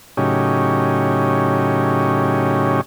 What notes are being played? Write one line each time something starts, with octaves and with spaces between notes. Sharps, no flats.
A2 C#3 F#3 C#4 D#4 G4